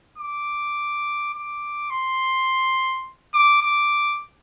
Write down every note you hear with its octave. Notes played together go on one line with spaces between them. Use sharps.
D6
D6
C6
D6
D6